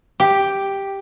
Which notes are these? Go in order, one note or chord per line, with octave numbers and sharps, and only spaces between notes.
G4